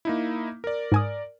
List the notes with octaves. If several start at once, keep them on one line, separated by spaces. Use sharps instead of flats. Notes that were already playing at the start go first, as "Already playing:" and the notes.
A#3 D#4 E4
A#4 D5
G#2 G#5 D#6